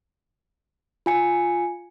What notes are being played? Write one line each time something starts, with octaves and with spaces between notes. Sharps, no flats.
F4 G#5 C#7